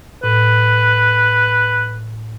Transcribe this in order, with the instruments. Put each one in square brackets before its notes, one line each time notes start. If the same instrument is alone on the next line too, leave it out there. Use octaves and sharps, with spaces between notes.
[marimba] A2 [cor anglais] B4